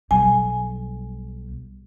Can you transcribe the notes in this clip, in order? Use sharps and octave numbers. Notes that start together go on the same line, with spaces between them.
B1 G3 G#5